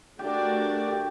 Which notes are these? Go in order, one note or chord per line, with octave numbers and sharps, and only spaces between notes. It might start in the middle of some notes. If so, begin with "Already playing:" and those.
A3 D4 F#4 G4 A#4 D5
G4